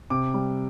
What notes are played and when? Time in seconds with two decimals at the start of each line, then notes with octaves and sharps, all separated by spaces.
0.10 C3 D6
0.34 G3